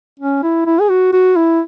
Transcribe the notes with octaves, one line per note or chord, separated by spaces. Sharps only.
C#4
E4
E4
G#4
F#4
F#4
E4